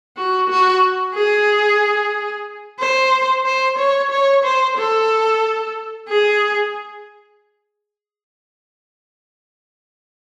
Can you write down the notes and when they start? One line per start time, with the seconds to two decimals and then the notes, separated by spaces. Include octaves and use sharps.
0.17 F#4
0.50 F#4
1.15 G#4
2.79 C5
3.45 C5
3.78 C#5
4.11 C#5
4.44 C5
4.77 A4
6.08 G#4